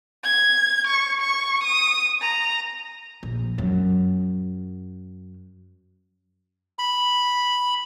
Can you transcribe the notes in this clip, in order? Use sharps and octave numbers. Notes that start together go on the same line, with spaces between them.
G#6
C#6
C#6
D#6
A#5
A#1
F#2
B5